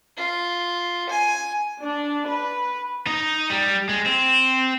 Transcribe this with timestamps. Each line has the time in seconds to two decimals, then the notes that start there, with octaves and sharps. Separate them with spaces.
0.17 F4
1.09 G#5
1.85 D4
2.28 B4
3.07 D#4
3.50 G3
3.89 G#3
4.06 C4